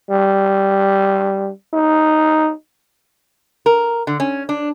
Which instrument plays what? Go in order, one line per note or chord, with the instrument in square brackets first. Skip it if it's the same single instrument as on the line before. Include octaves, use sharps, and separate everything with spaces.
[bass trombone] G3
D#4
[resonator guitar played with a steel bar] A#4
D3
C#4
D4